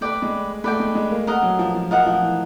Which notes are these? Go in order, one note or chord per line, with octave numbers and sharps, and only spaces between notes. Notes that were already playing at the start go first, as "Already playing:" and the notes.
A3 B4 D5 G5
G#3
A3 B4 D5 G5
G#3
G#3
A#3
A3 A#4 D#5 F#5
F#3
F3
F3
F3 A#4 D#5 F#5
F3
E3